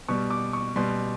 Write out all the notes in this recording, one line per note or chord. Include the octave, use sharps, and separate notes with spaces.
B2 G3 C#6
D6
C#6
B2 G3 C6